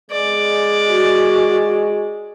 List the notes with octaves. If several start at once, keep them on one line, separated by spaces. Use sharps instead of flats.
G#3 D5
F#4